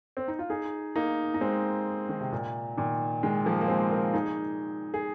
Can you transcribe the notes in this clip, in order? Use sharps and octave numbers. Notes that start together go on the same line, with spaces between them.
C4
D#4
F4
D#4 G#4
A#3 D#4
D#4
G#3 C4
D#3
C3
A#2
A#2 D#3
D#3 G#3
F3 A#3
A#3
G#3 C4
F4 A#4
D#4 G#4
G#4